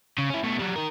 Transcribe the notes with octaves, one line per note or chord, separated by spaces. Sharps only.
C#3
C#4 E4
B2 A3
F#3 G3
D#3 A#4